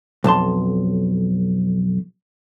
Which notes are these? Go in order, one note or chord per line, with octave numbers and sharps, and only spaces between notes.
B1 F2 A5 C6